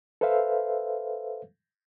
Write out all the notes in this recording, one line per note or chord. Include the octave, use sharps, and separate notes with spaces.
A4 B4 C5 E5 F5